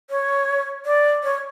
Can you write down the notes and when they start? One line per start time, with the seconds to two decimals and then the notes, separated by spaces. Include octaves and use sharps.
0.10 C#5
0.86 D5
1.24 C#5